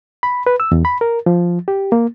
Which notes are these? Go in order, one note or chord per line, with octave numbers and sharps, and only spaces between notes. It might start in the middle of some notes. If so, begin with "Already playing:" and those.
B5
B4
E6
E2
B5
A#4
F3
G4
A#3